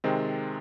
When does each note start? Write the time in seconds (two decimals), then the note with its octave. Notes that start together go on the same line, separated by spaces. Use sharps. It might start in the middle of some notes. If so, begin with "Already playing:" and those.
0.04 C3 D#3 G#3 C4